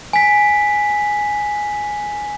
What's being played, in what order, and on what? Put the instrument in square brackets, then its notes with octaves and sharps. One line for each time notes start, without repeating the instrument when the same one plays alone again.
[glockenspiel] G#5 B6